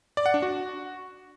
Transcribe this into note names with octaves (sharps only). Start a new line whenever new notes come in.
D5
F#5
D4
F#4